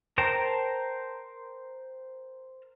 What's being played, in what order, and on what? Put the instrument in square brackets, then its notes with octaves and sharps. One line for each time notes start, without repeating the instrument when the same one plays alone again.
[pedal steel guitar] A#4 C5 G5 A5 A#5